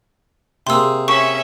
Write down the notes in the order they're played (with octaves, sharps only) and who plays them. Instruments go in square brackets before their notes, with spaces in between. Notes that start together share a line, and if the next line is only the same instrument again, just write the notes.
[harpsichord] C3 A#3 G#4 [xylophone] C6 E6
[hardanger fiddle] C#4 E5 [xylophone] C#6